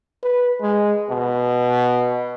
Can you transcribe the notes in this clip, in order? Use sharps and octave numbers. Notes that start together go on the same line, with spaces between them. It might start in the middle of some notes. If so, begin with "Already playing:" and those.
B4
G#3
B2